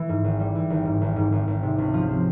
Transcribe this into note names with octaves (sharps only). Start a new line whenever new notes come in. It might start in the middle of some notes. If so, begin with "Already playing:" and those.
Already playing: E3
G#2
G#1
G3
E3
G#1
G#2
G#1
G#2
G#1
G#1
C3
C#2
F3
C4